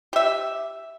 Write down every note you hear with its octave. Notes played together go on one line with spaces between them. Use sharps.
G4 E5